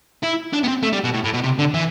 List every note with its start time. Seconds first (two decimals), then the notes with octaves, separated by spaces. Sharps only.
0.23 E4
0.53 D4
0.63 B3
0.68 C4
0.83 A3
0.93 G3
1.04 B2
1.14 A2
1.24 A2
1.34 B2
1.43 C3
1.59 D3
1.74 E3